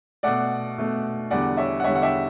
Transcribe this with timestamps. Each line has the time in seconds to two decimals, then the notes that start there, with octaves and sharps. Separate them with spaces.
0.23 B2 A3 D5 F#5
0.78 B2 A3
1.31 E2 D3 G3 D5 F#5
1.57 C#5 E5
1.80 F#5
1.84 E2 D3 G3 C#5 E5
1.95 F#5
2.02 E5 G5